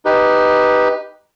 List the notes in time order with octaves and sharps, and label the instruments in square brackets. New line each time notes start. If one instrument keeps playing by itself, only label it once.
[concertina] D#4 G4 B4